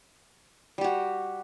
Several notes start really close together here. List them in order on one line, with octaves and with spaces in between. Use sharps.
G3 G4 F#4